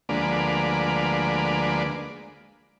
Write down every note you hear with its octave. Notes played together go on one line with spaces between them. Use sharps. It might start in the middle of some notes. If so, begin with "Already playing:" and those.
D2 F3 G#3 A#3 B4 D5